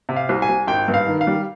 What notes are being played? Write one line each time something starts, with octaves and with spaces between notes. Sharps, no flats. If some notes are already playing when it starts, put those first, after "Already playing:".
C3
F5
C2
G#5
C2
G#1 G5
G2
F5
D#3
F5
G3